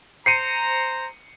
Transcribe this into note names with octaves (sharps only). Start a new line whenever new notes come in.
C5 A#5 C7 C#7 D#7